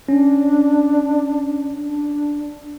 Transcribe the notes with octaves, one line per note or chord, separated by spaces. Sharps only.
C#4 D4
D4